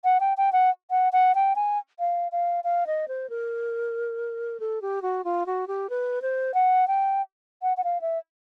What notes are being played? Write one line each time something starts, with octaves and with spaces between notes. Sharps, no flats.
F#5
G5
G5
F#5
F#5
F#5
G5
G#5
F5
F5
F5
D#5
C5
A#4
A4
G4
F#4
F4
F#4
G4
B4
C5
F#5
G5
F#5
F#5
F5
E5